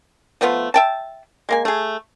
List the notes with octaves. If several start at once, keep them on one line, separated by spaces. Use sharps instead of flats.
F3 A3 B3 F4
E5 G5 A5
G#3 A#3 G#5
A3 G#4